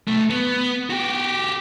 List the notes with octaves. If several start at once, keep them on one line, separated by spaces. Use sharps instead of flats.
B1 A3
B3
F#4 G4